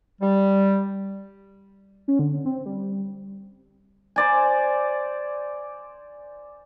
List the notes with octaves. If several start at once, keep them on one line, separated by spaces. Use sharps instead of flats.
G3
C#4
D3
C4
G3
C5 D5 G#5